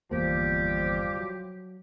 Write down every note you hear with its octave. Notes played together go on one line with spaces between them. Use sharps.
G1 E2 F3 G3 A#3 G4
F#3